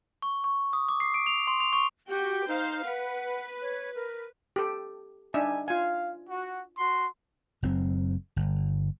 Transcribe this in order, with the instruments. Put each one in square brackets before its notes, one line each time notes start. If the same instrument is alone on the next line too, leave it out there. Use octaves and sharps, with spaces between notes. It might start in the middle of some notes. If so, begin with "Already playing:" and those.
[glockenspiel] C#6
C#6
D#6
D6
C7
D7
F7
C6
F7
C#6
[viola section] F#4 G5 [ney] G4
[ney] D#4 [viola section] C5 F5
[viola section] B4 [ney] F#5
[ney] C#5
A#4
[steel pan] G4 A4
[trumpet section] G3 G#5 [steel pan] D4 D#4 E5
[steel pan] F4 G#5 [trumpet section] F5
[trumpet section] F#4
F#4 C6
[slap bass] F#1 F#2 C4
G1